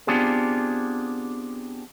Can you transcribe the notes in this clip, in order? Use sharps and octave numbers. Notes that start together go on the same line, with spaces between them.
B3 C4 D4 F4 G4 G#4